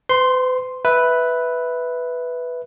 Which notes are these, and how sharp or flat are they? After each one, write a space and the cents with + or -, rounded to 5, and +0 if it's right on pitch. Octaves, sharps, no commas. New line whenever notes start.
B4 +45 C6 +0
B4 +0 E5 -10